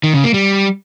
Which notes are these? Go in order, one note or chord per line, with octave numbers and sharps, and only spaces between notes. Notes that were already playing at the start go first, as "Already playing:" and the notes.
D#3
C#3
A#3
G3